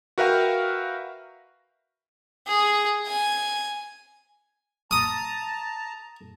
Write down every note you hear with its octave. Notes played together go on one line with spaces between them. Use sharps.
F#4 A#4 B4 E5 F5 G5
G#4
G#5
A5 A#5 D#6